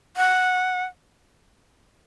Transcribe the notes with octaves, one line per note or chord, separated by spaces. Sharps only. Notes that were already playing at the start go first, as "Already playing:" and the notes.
F#5